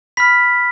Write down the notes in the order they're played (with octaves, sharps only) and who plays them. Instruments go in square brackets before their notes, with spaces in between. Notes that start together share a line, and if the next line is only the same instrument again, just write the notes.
[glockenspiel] B5 F6 B6